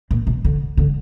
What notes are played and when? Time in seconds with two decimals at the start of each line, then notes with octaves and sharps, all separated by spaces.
0.11 A#2
0.27 B2
0.44 D3
0.77 D3